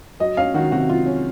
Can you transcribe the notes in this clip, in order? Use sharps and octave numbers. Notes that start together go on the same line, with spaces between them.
F#3 D#5
C#4 F5
D#3 F#4
C3 F#4
F#3 F4
C#4